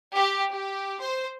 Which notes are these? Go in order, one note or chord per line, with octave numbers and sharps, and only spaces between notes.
G4
G4
C5